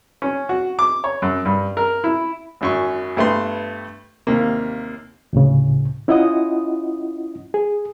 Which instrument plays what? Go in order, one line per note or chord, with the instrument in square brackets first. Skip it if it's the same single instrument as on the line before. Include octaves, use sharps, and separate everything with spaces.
[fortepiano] C#4
F#4
D6
C#5
F#2
G2
A#4
E4
G#1 F#2 C#6
G2 A3 B3 C6
D#2 C3 A#3
[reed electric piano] D2 A2 C#3
C#4 E4 F4 D#5 F#5 D#6
G#4